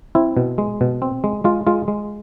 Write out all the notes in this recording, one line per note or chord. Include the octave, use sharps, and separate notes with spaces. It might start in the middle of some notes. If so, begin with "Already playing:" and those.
C4 E4
B2
G#3
B2
C4
G#3
G#3 F4
G#3 F4
G#3